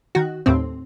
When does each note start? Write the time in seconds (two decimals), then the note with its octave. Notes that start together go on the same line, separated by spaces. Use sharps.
0.15 D#3 F#4
0.46 D#2 A2 C4